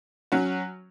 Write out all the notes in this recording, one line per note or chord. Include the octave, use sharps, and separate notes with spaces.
F#3 C#4 F#4